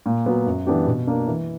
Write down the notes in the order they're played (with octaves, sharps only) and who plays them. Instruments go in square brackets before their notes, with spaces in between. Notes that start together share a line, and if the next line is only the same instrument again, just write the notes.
[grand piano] A#2
F#3 B3
F#2
E3 B3 D4 G4
B2
A#3 D4
E3